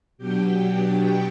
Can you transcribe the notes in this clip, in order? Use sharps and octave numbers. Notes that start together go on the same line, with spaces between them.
B2 F#3 B3 D4 G4 G5